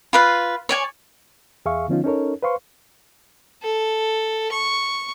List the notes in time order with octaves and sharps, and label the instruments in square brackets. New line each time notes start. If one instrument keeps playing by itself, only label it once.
[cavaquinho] F4 B4 F5
C#5 D5 G#5
[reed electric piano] E2 G#4 E5 F5 C#6
D3 F3 B3 C#4 D#4 F4
C#4 D#4 A4 A#4 C#5
B4 C5 F5 C6 C#6
[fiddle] A4
C#6